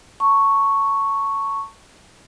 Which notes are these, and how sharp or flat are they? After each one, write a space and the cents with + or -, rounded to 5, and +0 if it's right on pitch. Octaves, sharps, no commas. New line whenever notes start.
A5 +35 C#6 +0